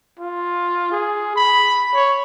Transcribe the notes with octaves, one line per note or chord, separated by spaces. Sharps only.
F4
G#4
B5
C#5